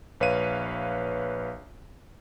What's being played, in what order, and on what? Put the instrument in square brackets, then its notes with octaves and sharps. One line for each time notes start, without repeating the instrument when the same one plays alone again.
[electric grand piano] A#1 B4 C#5 F5 D#7